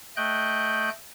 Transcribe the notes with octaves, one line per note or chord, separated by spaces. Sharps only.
A3 D#5 G5 F#6 G6